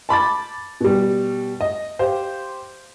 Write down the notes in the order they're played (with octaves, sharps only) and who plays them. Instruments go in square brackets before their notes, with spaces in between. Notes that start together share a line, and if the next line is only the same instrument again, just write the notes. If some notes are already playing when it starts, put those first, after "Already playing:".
[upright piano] A5 B5 D6 A6
B2 G3
D#5
G4 C5 F5